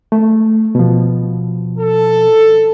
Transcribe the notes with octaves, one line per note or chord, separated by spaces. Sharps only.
A3
B2 F3
A4